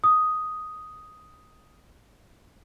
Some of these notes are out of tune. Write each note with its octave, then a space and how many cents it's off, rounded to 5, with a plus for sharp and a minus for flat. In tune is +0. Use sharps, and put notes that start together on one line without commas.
D#6 +5